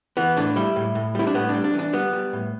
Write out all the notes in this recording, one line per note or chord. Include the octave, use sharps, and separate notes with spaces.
E3 B3
A2 D4
G3 E4
A2
A2
G3 E4
D4
A2 B3
D4
G3
D4
E3
D4
G3 B3
G3
A2